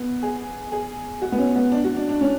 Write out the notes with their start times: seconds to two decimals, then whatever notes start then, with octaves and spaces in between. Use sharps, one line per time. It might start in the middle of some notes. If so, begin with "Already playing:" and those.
Already playing: B3
0.23 G#4
0.72 G#4
1.22 F#4
1.32 B3
1.39 C#4
1.56 B3
1.72 D4
1.84 F#4
1.96 D4
2.09 D4
2.21 C#4